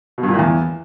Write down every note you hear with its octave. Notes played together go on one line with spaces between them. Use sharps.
B2
G2
A#2
A2
E2